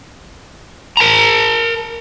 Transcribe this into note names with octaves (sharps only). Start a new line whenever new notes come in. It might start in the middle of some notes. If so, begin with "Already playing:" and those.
A#4 A5 A#5